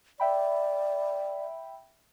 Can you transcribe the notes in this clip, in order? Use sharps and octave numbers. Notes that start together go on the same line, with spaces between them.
D5 E5 G5 B5